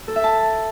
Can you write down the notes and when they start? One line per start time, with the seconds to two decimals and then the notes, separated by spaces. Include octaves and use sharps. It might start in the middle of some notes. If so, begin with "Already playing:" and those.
0.08 A4
0.16 E5
0.24 A5